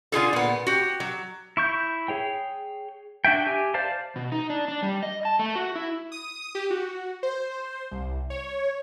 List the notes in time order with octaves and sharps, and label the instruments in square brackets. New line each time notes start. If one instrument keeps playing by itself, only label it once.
[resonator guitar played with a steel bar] D3 F4 G#4 A4
A#2 B3
F#4 G4
F#3
[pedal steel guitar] E4 C#6 G6
G#4 C#5 G5
D4 F#4 E5 G5
G4 E5 G#5
C5 D5 F5 A5
[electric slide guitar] B2
D#4
D4
D4
G3
D#5
A5
A3
F#4
E4
[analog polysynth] D#6
G4
F#4
C5
C2
C#5